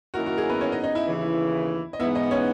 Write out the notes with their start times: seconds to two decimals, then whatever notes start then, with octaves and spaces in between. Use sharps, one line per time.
0.14 F#2 D#3 A#3 E4 F#4 A#4
0.26 F#4
0.38 G#4
0.50 B3 B4
0.61 C#4 C#5
0.72 D#4 D#5
0.83 D#4 D#5
0.95 E4 E5
1.07 D#2 C#3 E3
1.93 D#5
2.00 G#2 E3 B3 E4 E5
2.15 D#4 D#5
2.31 C#4 C#5